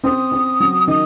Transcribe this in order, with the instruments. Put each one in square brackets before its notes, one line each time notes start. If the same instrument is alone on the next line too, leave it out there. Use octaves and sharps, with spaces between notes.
[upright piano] C4 [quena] D#6
[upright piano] C4
F#3
[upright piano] D#3 [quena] D#6